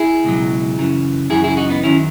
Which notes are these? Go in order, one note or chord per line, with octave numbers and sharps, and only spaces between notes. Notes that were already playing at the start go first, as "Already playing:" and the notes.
Already playing: E4 G#4
C#2 B2 F#3
F#2 C#3 E3
F#2 C#3 E3 E4 G#4
E4 G#4
D#4 F#4
B3 D#4
F#2 D#3 F#3 C#4 E4